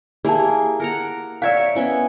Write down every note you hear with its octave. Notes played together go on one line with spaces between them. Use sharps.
A#3 E4 G4 G#4 A5
A#4 F#5 A#5
A#4 C#5 D5 E5 F5
B3 C#4 E4